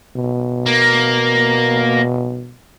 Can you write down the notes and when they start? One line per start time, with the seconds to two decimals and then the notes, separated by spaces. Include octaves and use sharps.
0.16 B2
0.66 A#3